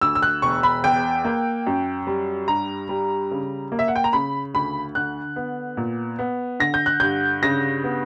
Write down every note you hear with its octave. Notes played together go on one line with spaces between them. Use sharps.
D2 E6
E6
F#6
E1 C#6
B5
E2 G5
A#3
F#2
G3
G2 A#5
G3
C#3
A#3
E5
F#5
G5
A#5
C#3 B5
D2 B5
D3 F#6
B3
A#2
B3
D3 A#6
G6
F#6
G2 G6
C#3 A#6
B3